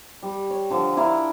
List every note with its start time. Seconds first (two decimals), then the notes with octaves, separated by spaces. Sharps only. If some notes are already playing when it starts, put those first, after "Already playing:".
0.23 G3
0.50 C#5
0.70 D3 F3 A4
0.97 D4 E4 A#4